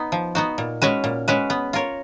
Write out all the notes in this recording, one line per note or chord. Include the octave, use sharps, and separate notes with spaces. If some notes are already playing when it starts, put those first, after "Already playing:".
Already playing: B3 D#4
F3
B3 D#4 F#4
A#2
G#3 C#4 F#4 B4
A#2
G#3 C#4 F#4 B4
B3
F4 A#4 C#5